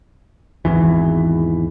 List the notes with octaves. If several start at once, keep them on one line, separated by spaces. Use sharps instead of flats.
G#1 E2 E3